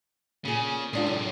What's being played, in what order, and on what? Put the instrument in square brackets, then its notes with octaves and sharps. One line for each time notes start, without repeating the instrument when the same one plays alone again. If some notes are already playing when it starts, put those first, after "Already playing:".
[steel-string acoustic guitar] A#2 G#4 [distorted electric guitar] C#3
[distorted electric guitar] A2 C3 [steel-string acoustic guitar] G#3 D4 F4
[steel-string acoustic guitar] F#2